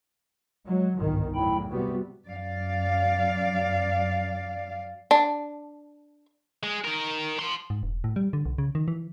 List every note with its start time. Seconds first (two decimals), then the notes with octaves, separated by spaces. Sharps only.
0.67 F#3 G#3
0.97 G1 C2 G#2 D#3
1.35 E2 A2 F#3 E4 G5 B5
1.71 C3 G3 B3 F#4
2.27 F#2 D5 F5
5.11 D4
6.63 G#3
6.84 D#3 A#4
7.39 A5 C6
7.70 G#2
7.83 E1
8.04 A2
8.16 G3
8.33 D3
8.46 B1
8.58 C#3
8.75 D#3
8.88 E3